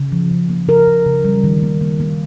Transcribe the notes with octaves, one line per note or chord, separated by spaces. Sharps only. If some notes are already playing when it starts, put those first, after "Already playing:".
Already playing: C#3
F3
C#3
A#3
C#3 A#4
C#3
C#3
G3
D#3
A#3
A#3
A#3